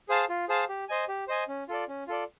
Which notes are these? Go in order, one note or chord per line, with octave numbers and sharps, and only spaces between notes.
G#4 C5 F5 A5
F4
G#4 C5 F5 A5
G4
C5 D#5 G#5
G4
C5 D#5 G#5
C#4
F4 A4 D5
C#4
F4 A4 D5